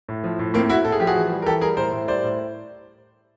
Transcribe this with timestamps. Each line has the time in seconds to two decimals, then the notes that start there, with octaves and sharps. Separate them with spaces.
0.09 A2
0.24 F3
0.39 A2
0.54 A2 A#3 C4
0.69 A2 E4 F#4
0.85 A2 A4
0.92 G#4
1.00 F3 G4
1.07 F#4 G#4
1.16 E3
1.31 G3
1.42 A#4
1.46 E3 G4 A4
1.61 G3 G#4 A#4
1.77 A2 A#4 C5
1.92 A2
2.08 G3 C5 D5
2.23 A2